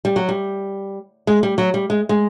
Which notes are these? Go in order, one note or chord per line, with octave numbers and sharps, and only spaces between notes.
G3
F#3
G3
G#3
G3
F#3
G3
G#3
G#3